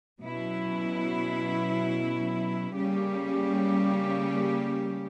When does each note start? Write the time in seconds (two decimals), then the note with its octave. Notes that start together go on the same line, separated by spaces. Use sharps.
0.20 B2 F#3 C#4 E4
2.74 C#3 G3 A#3 C#4 G4